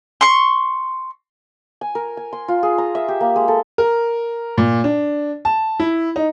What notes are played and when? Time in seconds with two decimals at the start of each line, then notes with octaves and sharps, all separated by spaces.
0.21 C6 C#6
1.81 G#5
1.95 A#4
2.17 G#5
2.33 C6
2.48 F4
2.63 G#4
2.78 A#5
2.95 E5
3.08 G4
3.20 A#3
3.36 G#3
3.48 A4
3.78 A#4
4.58 A#2
4.84 D4
5.45 A5
5.80 E4
6.16 D#4